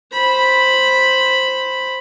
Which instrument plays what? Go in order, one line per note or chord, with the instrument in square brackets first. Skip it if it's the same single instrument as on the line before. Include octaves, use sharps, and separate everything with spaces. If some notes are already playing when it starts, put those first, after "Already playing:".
[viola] C5 B5